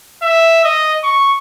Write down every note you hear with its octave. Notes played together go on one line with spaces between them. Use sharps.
E5
D#5
C#6